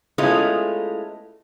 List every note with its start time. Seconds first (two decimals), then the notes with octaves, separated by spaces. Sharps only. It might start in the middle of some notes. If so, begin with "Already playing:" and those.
0.18 G#3 A3 B3 C#4 E4 F4